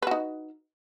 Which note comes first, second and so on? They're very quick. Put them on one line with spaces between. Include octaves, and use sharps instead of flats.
B4 F#4 D#4